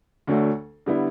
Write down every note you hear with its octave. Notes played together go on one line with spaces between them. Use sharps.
D2 D3 F#3 A3
D3 G3 B3 E4